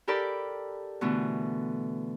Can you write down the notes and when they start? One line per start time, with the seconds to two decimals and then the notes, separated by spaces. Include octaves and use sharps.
0.08 G4 A4 A#4 D5 B5 D6
1.01 B2 D3 E3 A3